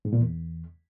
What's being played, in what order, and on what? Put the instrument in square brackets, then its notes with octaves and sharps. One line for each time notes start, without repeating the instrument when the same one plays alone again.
[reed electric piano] G#2
A#2
E2